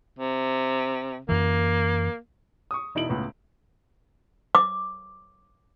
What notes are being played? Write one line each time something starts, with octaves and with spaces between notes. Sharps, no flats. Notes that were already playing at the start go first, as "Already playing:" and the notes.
C3
F#2 E3 A#3
C#6 D#6
E1 D#4 E4 D7 F#7
C#2 A2 B3
D6